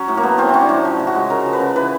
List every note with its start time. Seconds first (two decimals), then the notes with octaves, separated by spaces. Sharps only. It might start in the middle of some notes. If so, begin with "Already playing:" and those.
Already playing: F#3 C#4
0.08 A2
0.17 A#3
0.23 A3 B3
0.38 A2 C4
0.49 C4
0.54 F#3 C#4
0.61 D4
0.69 A2 C#4
0.85 F3
0.99 C#3
1.07 F#4
1.15 G#3
1.30 C#3 A#4
1.46 F3
1.53 B4
1.60 C#3
1.76 E3 B4